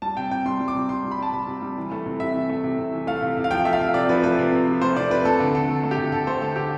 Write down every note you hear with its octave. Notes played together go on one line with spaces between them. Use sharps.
G3 A5
C3 G5
C3 G5
G3 C6
G3
D6
C3
C3 C6
G3
B5
G3 A5
C3 B5
C3
G3
E3
A3
C3
C3 E5
E3
A3
C3
C3
E3
A3 F5
C3
C3
F5
F3 G5
A3 E5
F5
C3
C3 D5
F3 B4
A3 B4
C3
C3
F3
A3 C5
C3 D5
C3 B4
A3 A4
D3
D3 A4
A3
A3
G4
D3
D3 A4
A3 C5
A3 A4
D3 G4